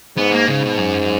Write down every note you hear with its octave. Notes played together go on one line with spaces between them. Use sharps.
G#2 B3
A#3
G#2 C#3
B2
F#2